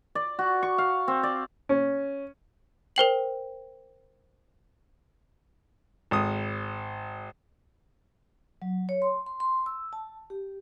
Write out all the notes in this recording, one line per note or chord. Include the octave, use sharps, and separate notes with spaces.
D5
F#4
C#6
F5
C4
D5
C#4
A#4 C5 G5 F#7
G#1 D#6
F#3
C#5
C6
C6
C6
E6
A5
G4